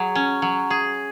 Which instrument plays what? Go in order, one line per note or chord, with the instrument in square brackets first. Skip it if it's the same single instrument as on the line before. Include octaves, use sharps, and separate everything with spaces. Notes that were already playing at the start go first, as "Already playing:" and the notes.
Already playing: [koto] F#3 G#4
C#4
F#3
G#4